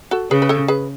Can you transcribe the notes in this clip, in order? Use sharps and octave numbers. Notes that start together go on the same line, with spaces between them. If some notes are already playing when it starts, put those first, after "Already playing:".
F#4 A4
C#3 G#4 B4
B4
A4 C#5
G#4 B4